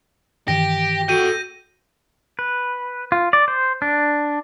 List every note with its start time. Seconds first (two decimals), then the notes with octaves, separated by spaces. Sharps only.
0.48 G2 D#3 E3 G4 A#6
1.08 F#4 A4 G5 G6 D#7
2.39 B4
3.12 F4
3.33 D5
3.48 C5
3.82 D4